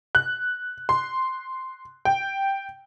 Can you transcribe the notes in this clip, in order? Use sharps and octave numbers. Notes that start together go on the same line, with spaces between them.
F#6
C6
G5